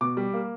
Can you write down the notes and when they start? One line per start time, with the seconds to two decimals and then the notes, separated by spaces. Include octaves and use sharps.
0.01 B2 D6
0.17 G3
0.33 A#3